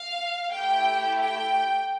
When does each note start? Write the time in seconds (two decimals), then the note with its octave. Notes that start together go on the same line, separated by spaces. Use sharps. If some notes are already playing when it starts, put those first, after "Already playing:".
Already playing: F5
0.51 A3 E4 G4 G5
1.19 G5